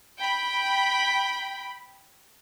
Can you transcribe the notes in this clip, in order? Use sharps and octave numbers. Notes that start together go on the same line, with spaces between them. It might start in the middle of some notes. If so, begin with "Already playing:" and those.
G5 B5